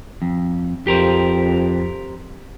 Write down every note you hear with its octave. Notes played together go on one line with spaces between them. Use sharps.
F2
F2 G4 A#4 C5